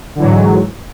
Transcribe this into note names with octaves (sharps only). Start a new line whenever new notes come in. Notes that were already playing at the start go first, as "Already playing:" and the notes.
G#2 D3 E3 F#3